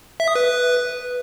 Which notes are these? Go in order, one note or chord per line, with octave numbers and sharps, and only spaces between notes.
E5
D#6
B4